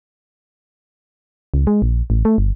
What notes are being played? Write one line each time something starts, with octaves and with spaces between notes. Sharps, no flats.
C#2
G#3
A#1
A1
A3
G1